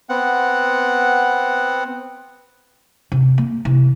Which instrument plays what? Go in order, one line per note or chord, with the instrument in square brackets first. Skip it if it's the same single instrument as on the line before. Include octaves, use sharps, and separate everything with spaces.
[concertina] B3 C4 F#5
[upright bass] C3
A#3
C3 E3